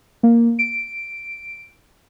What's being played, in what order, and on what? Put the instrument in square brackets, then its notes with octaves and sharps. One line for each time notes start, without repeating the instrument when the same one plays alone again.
[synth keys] A#3
D7